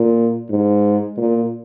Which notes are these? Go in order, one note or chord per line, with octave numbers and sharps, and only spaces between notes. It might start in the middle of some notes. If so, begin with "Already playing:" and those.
Already playing: A#2
G#2
A#2